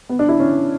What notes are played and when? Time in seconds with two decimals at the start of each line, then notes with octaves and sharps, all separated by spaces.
0.09 B3
0.19 D4
0.29 E4
0.40 C#4